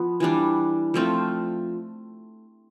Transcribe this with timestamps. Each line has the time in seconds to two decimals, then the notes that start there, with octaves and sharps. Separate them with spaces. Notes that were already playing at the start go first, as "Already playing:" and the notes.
Already playing: F3 B3
0.20 E3 G3 D4
0.94 F3 A3 C4 F4